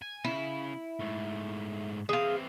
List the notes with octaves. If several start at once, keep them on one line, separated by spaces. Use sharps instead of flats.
G#5
C#3 E4
G#2 A3
E3 C4 G#4 F5